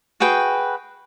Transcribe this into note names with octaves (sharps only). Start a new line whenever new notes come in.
F#4 G#4 B4 G5